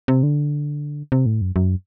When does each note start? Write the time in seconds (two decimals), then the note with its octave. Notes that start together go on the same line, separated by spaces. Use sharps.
0.08 C3
0.23 D3
1.12 C3
1.26 A2
1.41 F#2
1.56 F#2